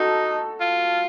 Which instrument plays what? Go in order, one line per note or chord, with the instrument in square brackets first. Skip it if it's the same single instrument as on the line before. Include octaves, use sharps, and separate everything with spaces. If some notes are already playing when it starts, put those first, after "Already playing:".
Already playing: [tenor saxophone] D#4 [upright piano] F#4 A4
[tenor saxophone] F4